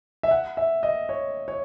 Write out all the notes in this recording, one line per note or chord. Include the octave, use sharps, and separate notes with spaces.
E5
F#5
E5
D#5
C#5
C#5